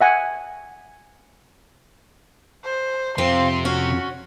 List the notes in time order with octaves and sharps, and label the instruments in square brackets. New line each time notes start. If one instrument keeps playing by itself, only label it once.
[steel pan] E5 F#5 G#5
[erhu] C5
[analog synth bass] F2 [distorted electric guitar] C3 [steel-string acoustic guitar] C4 F4 [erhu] C6
[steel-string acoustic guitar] C#4 [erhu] F#4